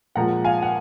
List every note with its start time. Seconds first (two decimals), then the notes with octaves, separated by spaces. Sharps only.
0.15 A#2 F3 G#3 F#5 A#5
0.44 F5 G#5
0.62 F#5